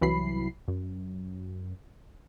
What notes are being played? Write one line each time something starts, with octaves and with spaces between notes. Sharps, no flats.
C2 E3 F#3 B5 C7
F#2